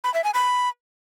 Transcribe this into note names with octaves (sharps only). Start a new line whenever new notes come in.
B5
E5
G#5
B5